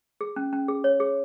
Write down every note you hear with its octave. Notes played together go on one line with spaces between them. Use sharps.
G#4
C#4
C#4
G#4
C#5
G#4